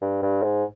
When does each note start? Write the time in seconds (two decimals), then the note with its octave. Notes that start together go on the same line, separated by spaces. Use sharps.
0.01 G2
0.22 G2
0.43 G#2